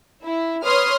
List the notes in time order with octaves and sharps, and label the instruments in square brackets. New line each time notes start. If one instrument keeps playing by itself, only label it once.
[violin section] E4
B4 C#5 C6 D#6 F6